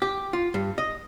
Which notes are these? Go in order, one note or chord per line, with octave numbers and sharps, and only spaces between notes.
G4
F4
G2
D#5